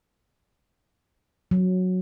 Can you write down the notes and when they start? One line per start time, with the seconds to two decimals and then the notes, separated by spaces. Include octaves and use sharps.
1.51 F#3